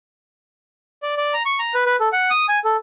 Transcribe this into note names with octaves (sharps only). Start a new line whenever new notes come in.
D5
D5
A#5
C#6
A#5
B4
B4
A4
F#5
D#6
G#5
A4